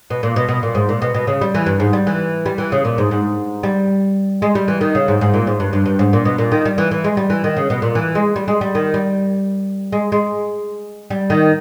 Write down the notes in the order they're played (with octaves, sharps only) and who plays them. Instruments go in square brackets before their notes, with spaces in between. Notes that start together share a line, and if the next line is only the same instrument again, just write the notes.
[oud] B2
A#2
B2
B2
A#2
G#2
A#2
B2
B2
C#3
G3
E3
G2
G#2
G3
E3
G3
E3
C#3
A#2
G#2
G#2
G3
G#3
G3
E3
D#3
C#3
G#2
G#2
A#2
G#2
G2
G2
G2
G#2
A#2
B2
A#2
D#3
G3
E3
E3
G#3
G3
E3
D#3
C#3
B2
A#2
E3
G#3
G3
G#3
G3
D#3
G3
G#3
G#3
G3
D#3